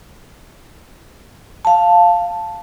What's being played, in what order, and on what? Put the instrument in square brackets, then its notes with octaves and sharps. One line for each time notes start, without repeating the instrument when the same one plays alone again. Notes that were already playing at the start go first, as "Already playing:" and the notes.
[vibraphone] F5 A5